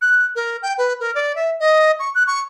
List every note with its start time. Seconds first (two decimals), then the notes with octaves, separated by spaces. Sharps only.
0.02 F#6
0.36 A#4
0.62 G5
0.78 B4
1.00 A#4
1.15 D5
1.35 E5
1.60 D#5
1.99 C#6
2.15 F#6
2.27 C#6